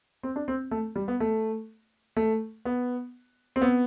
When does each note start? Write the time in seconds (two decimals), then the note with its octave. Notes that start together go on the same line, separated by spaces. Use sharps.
0.23 C4
0.36 D4
0.48 C4
0.71 A3
0.96 G3
1.08 B3
1.20 A3
2.17 A3
2.65 B3
3.56 C4
3.62 B3